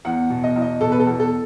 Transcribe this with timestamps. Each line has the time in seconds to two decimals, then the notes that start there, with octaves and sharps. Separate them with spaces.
0.05 E2 F#5
0.30 B2
0.44 D#5
0.56 E2
0.62 D#5
0.81 B2 A4
0.92 B4
1.00 A4
1.07 E2
1.20 A4